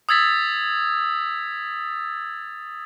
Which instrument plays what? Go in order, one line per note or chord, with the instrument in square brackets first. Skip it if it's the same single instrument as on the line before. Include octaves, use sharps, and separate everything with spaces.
[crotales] D#6 E6 G#6 A6 B6